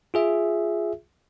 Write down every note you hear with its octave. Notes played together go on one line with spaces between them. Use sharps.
F4 G#4 E5